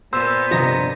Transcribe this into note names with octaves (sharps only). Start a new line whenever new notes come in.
A#2 B3 C5 E6
G2 C3 F3 D#5 A#5